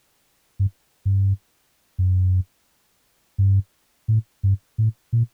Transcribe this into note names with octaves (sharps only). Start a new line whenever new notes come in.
G2
G2
F#2
G2
A2
G2
A2
A#2